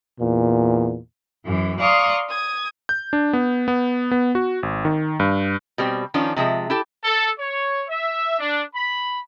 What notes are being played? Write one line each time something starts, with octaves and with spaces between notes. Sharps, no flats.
E2 A#2
F#2 E3
D5 F5 A#5 C6 C#6 D#6
D#6 G#6
G6
D4
B3
B3
B3
F#4
G#1
D#3
G2
B2 G3 C4
D#3 F3 C#4 D4 F4
C3 F3 G#3 E5
E4 G4 A4
A4
C#5
E5
D4
B5